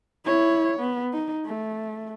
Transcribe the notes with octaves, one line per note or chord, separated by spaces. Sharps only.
E4 C#5
B3
D#4
A3